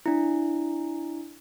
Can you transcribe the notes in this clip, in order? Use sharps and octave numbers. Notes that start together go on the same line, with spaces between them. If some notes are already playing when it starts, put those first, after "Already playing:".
D4 E4